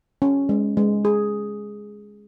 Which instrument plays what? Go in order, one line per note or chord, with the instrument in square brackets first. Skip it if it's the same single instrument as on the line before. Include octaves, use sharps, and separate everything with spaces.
[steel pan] C#4
G#3
G#3
G#4